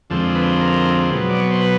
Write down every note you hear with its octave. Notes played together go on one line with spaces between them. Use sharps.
F2 D3 F3 G#3 C4 A4
B4
A#4
B2 F#3 B3
D5
C#5
C5
B4